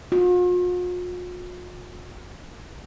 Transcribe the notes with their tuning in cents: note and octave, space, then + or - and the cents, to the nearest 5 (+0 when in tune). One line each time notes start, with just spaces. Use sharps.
F4 +45